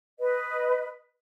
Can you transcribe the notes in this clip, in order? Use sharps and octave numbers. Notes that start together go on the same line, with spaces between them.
B4 D#5